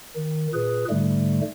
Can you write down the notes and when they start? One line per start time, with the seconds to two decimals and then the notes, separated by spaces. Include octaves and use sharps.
0.16 D#3
0.54 A#2 G#4 B4
0.90 G#2 D3 G3 A3